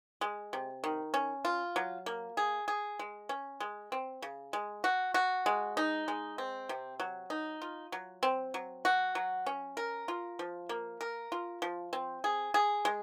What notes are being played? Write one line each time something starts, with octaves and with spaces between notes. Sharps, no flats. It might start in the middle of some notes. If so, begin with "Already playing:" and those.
G#3
C3
D#3
C#4
F4
F#3
A#3
G#4
G#4
G#3
C#4
G#3
C4
C#3
G#3
F#4
F#4
G#3
D#4
G#3
C4
C3
F#3
D#4
F4
F#3
C4
F#3
F#4
F#3
C#4
A#4
F4
F3
A#3
A#4
F4
F3
C4
G#4
G#4
G#3